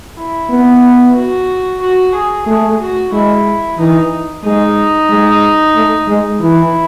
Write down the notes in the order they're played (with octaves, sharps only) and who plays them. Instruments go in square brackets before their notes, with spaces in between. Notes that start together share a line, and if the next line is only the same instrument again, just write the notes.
[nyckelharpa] E4
[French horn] B3
[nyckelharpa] F#4
F#4
G#4
[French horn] A3 [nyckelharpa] G#4
[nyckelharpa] F#4
[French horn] G#3 [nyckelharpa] E4
[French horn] E3 [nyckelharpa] D#4
[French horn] G#3 [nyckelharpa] D#4
[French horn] G#3
A3
G#3
[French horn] E3 [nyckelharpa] E4